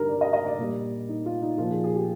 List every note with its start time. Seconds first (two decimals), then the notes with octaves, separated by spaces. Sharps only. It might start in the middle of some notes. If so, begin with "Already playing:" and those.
Already playing: G2 D3 G3 D#4 A#4
0.09 D5
0.21 D#5
0.33 D#5
0.46 D5
0.58 A#2 G3
1.09 D#4
1.26 F4
1.42 D#4
1.58 A#2 F3 F4
1.71 G#4
1.84 G#4
1.96 G4